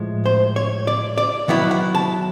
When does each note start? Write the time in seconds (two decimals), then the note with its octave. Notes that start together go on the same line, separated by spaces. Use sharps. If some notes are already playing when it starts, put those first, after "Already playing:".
Already playing: A2 F3 G#3
0.26 C5
0.56 C#5
0.87 D5
1.18 D5
1.48 D#3 F#3 B3 E4
1.71 F#5
1.95 A5